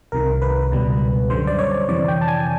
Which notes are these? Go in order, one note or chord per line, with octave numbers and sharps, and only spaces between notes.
C2 C3 D#3 A#4
B4
C#2 B2 G3
F#2 D3 G3 C5
D5
C#5
F2 C3 E3 D5
G5
A5
G#5